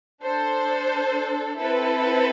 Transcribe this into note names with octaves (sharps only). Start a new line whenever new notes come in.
D4 A4 C5
C4 E4 A4 B4